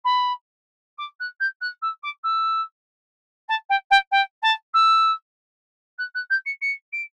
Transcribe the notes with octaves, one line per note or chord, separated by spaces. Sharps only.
B5
D6
F#6
G6
F#6
E6
D6
E6
A5
G5
G5
G5
A5
E6
F#6
F#6
G6
C#7
C#7
D7